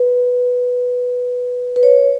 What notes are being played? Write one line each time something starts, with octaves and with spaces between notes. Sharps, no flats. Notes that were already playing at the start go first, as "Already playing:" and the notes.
Already playing: B4
B4
C#5